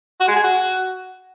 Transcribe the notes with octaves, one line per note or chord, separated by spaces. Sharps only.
F#4
G#3
G#4
F#4